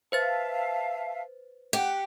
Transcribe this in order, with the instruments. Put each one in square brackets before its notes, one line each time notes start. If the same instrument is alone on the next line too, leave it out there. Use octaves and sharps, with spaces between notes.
[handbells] B4 C5 A6 [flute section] E5 F5 A5
[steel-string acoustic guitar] G4 [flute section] F#5